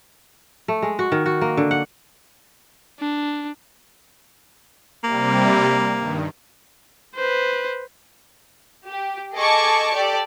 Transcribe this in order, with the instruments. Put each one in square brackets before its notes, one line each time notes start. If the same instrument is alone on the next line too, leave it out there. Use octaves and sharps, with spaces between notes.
[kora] A3
G#3
F#4
D#3
F#4
A#3
D3
F#5
[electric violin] D4
[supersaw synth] C3 G3 [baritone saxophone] A#3
[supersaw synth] G2 D#3
[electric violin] B4 C5
[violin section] G4
G#4 A4 D#5 A5 C#6 D6
G4 A4 D5